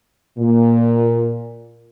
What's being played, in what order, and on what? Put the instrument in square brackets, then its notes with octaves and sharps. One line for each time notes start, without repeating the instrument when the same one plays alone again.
[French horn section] A#2